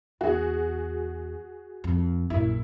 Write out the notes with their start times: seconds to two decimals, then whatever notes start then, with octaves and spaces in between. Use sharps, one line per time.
0.21 E2 F#4 G#4
1.84 F2
2.30 A#1 F#2 E4